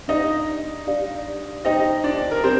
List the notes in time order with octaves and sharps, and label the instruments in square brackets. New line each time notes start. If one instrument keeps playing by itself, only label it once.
[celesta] D4 G4 D5 F5 [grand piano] D#4 D#5
[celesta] D4 G4 D5 F5
[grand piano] D#4 D#5 [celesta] G4 C5 G5
[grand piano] D4 D5
A#4
[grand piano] C4 C5 [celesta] G4